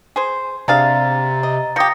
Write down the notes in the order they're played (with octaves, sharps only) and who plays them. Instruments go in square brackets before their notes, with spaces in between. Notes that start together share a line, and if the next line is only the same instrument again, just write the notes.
[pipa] G#4 C5
[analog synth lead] C3 [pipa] D4 G#4 F5 [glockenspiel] A#5 A6
[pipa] D#5
[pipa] F3 G4 [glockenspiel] D#6 A#6 C#7